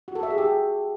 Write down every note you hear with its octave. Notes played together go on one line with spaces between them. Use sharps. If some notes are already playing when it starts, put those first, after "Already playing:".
F#4
A4
E5
G#4
G4